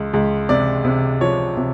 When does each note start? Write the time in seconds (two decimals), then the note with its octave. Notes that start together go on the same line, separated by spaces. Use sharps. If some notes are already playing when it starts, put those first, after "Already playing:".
Already playing: C#2
0.13 C#2
0.49 C3 D5
0.85 C3
1.21 F3 C#5
1.57 C3